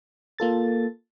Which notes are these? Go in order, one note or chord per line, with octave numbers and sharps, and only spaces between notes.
A#3 F4 A4 A6